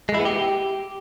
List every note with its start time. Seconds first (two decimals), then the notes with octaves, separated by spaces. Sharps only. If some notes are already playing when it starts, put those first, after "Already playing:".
0.09 G#3
0.14 E4
0.20 B3
0.25 G4